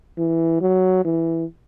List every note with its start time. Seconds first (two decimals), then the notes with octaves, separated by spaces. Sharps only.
0.18 E3
0.61 F#3
1.05 E3